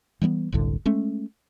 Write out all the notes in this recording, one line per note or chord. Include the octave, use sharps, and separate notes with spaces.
E3 G3 A3 B3
F#1 C2 A2 D3
G#3 A3 C#4